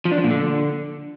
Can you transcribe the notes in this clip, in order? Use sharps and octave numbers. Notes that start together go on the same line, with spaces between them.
F3
D4
F3
A#2
D3